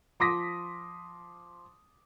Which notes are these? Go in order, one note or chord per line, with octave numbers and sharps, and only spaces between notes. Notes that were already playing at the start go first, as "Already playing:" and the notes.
F3 C6 D6 D#6 A#6 B6